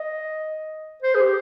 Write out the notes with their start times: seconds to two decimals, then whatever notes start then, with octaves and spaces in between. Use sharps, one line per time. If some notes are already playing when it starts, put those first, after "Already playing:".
Already playing: D#5
1.02 C5
1.15 G#4
1.20 G4